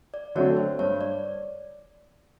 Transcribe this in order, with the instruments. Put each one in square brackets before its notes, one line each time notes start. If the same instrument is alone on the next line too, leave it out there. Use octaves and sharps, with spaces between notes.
[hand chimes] D5
[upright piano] D3 F#3 A3 C4 [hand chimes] C#5
[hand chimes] C5
[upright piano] G2 [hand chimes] C#5
[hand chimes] D5